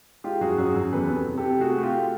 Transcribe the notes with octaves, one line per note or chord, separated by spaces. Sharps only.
G#3 F4 G4
F#2 F#4 G#4
F#2 F#4 G#4
F#2
E2 A4 B4
C3
C3
G4 A4
C3
A3 F#4 G#4
A3
F4 G4